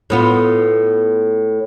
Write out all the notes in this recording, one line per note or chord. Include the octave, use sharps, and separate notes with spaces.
A2 B3 F4